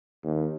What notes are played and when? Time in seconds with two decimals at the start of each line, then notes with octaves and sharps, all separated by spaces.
0.24 D#2